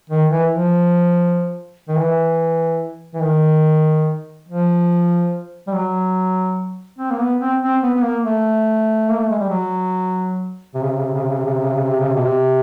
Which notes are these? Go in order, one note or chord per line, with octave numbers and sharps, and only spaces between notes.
D#3
E3
F3
D#3
E3
E3
D#3
F3
G3
F#3
C4
A#3
B3
C4
C4
B3
B3
A#3
A3
A#3
A3
G#3
G3
F#3
C3
C#3
C3
C#3
C3
C#3
C3
C#3
C3
C#3
C3
C#3
C3
C#3
C3
C#3
C3
B2
C3